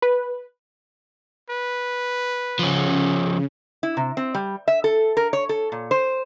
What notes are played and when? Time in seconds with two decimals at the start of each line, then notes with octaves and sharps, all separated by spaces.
0.02 B4
1.50 B4
2.59 C#3 F3 C#4
3.83 E4
3.97 C3
4.17 C4
4.35 G3
4.68 E5
4.84 A4
5.17 A#4
5.33 C#5
5.49 A4
5.72 A#2
5.91 C5